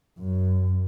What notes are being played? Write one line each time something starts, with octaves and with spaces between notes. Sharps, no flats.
F#2